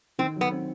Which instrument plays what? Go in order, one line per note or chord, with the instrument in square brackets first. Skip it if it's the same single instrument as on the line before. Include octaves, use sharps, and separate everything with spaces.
[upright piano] D#3 [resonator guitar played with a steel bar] C4
[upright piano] F#3 [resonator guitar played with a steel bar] B3
[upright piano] C4